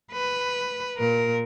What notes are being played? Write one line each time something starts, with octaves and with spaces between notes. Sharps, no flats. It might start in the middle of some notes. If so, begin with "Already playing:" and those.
B4
A#2 A#4